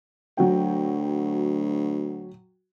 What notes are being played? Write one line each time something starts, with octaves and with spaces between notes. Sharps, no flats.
D2 F#3 F#4 G5